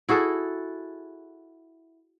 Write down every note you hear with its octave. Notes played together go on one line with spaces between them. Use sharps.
E4 F#4 G#4 A4